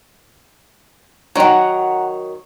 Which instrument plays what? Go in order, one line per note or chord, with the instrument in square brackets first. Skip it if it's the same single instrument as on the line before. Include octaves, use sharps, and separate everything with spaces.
[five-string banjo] D#3 F#3 [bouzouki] F#5 A#5